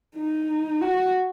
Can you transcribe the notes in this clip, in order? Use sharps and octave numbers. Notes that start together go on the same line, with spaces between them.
D#4
F#4